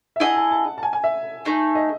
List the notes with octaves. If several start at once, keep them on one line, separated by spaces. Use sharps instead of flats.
E5
E4 G#4 D#5 F#5
A5
A5
A5
G#5
G#5
E5
A3 D#4 G#4
D#5